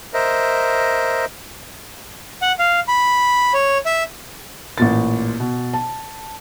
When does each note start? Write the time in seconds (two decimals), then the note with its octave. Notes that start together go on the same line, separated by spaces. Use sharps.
0.14 A#4 C5 D#5 E5
2.42 F#5
2.59 F5
2.88 B5
3.54 C#5
3.86 E5
4.78 A1 A#2 A6
5.40 B2
5.74 A5